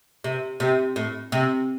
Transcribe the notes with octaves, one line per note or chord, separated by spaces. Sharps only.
C3
C3
A2
C3